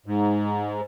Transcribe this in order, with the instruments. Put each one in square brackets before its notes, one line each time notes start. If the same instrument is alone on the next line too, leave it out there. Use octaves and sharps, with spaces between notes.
[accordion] G#2